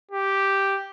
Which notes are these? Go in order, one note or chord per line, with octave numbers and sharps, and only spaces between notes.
G4